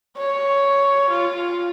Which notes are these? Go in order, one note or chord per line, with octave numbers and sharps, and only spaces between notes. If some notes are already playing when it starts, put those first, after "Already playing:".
C#5
F4